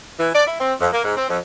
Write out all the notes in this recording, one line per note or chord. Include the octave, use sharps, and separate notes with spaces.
E3
D5
E4
C4
F2
A#3
G#2
C4
F2